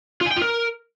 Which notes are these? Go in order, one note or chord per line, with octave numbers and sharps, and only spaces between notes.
F4
G#5
G5
F4
A#4